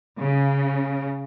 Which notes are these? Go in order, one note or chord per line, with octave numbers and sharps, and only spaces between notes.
C#3